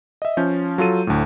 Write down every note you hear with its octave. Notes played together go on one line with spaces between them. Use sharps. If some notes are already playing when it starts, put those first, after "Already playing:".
D#5 E5
F3 C#4 G6
F#3 F4 A4 D#7
D2 A2